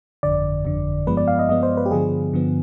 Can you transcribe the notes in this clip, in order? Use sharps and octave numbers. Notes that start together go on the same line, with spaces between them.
G1 F2 D3 D5
G1 F2 D3
G2 F3 G#3 B3 B4
D5
F5
D#5
G2 F3 G#3 B3 D#5
C5
B4
G4
G2 D3 F3 B3 G#4
G2 D3 F3 B3